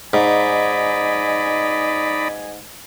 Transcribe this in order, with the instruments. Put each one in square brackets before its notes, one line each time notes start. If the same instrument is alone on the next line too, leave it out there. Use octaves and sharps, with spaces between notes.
[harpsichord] G#2 [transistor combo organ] D#4 D5 B5 [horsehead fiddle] D#5 G#5